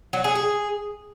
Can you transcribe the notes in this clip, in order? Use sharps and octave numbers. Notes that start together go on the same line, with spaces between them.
F#3
G#4
G#4